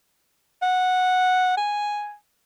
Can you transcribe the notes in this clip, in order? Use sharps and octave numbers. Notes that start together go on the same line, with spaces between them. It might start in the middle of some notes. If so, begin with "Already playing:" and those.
F#5
G#5